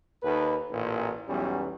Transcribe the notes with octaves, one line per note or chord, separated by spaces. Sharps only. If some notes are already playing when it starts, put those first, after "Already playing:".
D#2 D#3 A4 B4
A1 A#2
B1 E2 F#3 G3 C#4